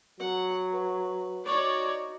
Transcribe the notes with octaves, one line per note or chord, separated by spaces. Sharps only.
F#3 F#5
B4
D#4 F#4 C#5 D5